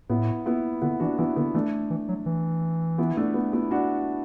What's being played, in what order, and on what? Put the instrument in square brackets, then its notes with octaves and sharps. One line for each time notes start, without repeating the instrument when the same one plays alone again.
[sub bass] A2 [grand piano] B3 E4
[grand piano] B3 E4
[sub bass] D3 [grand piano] B3 E4
[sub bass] E3 [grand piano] D4 F#4
[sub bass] E3 [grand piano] B3 E4
[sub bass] D3 [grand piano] B3
[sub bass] E3 [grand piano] A3 D4
[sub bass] E3
F#3
E3
[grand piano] B3 E4
A3 D4
B3
B3 E4
D4 F#4